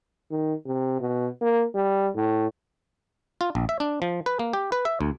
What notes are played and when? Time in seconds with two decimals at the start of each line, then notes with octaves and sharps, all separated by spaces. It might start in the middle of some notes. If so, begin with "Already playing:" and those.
0.31 D#3
0.66 C3
1.01 B2
1.41 A#3
1.75 G3
2.15 A2
3.41 F4
3.55 A#1
3.69 E5
3.80 D4
4.02 F3
4.26 B4
4.39 A#3
4.53 G4
4.72 B4
4.85 E5
5.01 D2